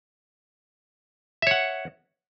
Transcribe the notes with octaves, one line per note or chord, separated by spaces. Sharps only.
C#5 E5 F#5